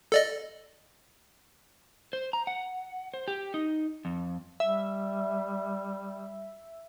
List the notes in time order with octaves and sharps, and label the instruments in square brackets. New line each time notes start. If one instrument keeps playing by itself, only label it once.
[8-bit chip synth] A4 D5 D#5
[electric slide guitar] C5
A#5
F#5
C5
G4
D#4
F2
[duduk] G3 [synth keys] E5